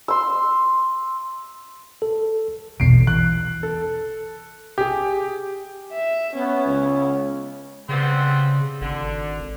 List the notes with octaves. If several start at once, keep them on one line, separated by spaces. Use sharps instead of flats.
C6 E6
A4
A#1 E2 B2 C7 D7
E3 F#6
A4
G4 G#4
E5
B3 C#4
C#2
C#3 G3 B3 C4
G#1 D3